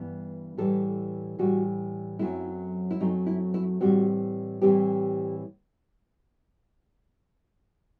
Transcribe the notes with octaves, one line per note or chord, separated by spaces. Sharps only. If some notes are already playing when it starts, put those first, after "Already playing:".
Already playing: G2 E3 B3
A2 E3 G3 A4
A2 E3 G3 F#4
F#2 F#3 A3 C4 E4
E4
F#2 F#3 A3 C4 D#4
E4
E4
A2 E3 G3 C4 F#4
A2 E3 G3 C4 G4